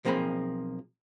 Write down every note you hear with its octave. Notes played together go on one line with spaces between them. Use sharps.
B1 F3 A#3 C4 G#4 B5